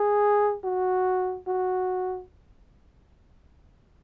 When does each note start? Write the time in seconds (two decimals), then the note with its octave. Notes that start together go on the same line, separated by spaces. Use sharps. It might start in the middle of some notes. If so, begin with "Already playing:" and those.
Already playing: G#4
0.64 F#4
1.47 F#4